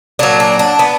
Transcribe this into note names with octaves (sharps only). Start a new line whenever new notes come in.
A#2 F#3 D4
D4
D4
B3